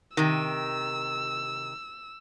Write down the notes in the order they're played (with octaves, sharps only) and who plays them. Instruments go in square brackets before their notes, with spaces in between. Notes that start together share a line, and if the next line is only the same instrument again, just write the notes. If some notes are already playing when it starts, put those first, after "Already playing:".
[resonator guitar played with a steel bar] C3 D#3 [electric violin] E6